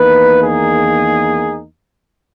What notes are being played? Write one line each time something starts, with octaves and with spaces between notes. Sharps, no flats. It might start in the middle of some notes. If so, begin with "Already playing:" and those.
Already playing: E2 D#3 A#3 D#4 B4
G#4